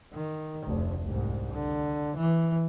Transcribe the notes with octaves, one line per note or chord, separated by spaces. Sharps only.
D#3
F1 D2
C2 G#2
D3
E3